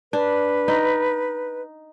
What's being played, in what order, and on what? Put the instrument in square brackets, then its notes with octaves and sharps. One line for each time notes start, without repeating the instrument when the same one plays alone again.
[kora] D4 [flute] B4
[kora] D#4